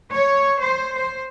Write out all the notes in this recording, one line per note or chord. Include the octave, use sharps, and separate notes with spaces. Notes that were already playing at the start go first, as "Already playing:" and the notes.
C#5
C5
C5